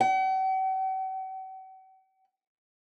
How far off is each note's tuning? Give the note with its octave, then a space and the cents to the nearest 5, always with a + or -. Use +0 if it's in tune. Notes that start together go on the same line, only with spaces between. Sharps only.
F#5 +45